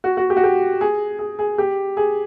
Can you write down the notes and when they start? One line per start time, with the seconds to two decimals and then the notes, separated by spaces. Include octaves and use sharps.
0.04 F#4
0.17 F#4
0.30 G4
0.37 F#4
0.44 G4
0.81 G#4
1.19 G#4
1.39 G#4
1.58 G4
1.97 G#4